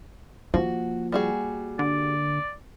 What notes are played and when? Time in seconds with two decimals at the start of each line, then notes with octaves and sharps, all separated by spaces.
0.54 F3 A#3 F#4
1.12 G3 F#4 G#4
1.79 D3 D5